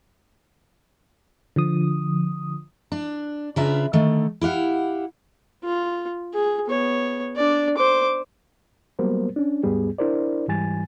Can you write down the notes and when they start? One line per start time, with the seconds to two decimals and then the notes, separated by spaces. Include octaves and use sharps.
1.56 D3 F3 D#6
2.92 D4
3.56 C#3 D4 F4 B4 E5 A#5
3.93 D3 D#3 A3
4.41 E4 G4 F5 F#5
5.64 F4
6.34 G#4
6.67 B3 C#5
7.36 D4 D5
7.77 C5 D6
8.99 F#3 G3 A#3 B3 A#4 C5
9.36 C#4 D4
9.63 D#2 G#2 G3 B3 G#4
9.98 D4 E4 A#4 C5 D5
10.48 G#2 E3 G3 G#5 A6